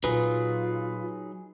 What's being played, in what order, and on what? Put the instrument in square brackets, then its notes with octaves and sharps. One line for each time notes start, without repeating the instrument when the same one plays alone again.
[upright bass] A#2 [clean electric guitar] F#3 D#4 G#4 [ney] F4 [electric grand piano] B4